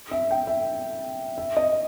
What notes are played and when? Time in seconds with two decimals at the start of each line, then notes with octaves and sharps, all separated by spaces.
0.11 E5
0.31 G5
0.47 E5
1.38 E5
1.57 D#5